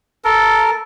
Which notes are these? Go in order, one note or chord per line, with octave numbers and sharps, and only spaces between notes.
A4 A#4